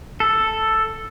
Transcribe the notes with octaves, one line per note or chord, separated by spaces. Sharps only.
A4